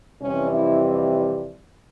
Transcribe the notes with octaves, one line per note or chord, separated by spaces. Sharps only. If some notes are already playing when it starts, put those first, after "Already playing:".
F2 C3 E3 G3 C#4
E4